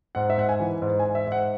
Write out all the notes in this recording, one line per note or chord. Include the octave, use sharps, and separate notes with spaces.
G#2 F#5
E5
G#2 F#5
G#5
E3
G#2
G#5
G#2
E5
G#2
F#5